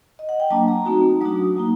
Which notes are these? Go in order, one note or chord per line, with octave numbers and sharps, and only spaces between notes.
D#5
F#5
G5
F#3 A#3 D4 A5
A#5
A3 C4 D#4 F#4
F#3 A3 D4 F#4 D#6
F#3 A#3 D#4